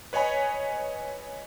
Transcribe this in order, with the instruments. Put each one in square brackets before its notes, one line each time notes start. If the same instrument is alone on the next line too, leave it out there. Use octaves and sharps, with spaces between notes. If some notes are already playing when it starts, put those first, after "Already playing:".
[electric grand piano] B4 C#5 D#5 G#5 B5